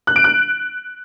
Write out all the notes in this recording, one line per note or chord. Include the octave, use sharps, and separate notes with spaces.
F#6
D7
F#6